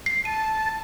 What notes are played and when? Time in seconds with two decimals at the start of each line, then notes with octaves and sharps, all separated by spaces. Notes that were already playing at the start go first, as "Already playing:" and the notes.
0.06 C7
0.25 A5 D#7